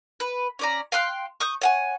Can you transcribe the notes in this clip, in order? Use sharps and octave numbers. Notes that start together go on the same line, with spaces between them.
B4
C#4 D5 A#5
F5 G5 C6 F#6
C#6 D#6 G6
C#5 F#5 G#5